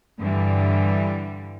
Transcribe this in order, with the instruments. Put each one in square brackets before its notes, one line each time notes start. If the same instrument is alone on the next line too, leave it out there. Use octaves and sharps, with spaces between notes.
[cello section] G2 D3 E3 G3